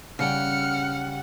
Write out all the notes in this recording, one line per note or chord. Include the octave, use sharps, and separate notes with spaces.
C#3 G3 F#5 G5 F6 C#7